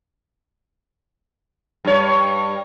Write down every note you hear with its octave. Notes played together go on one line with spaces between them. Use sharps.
G2 C#5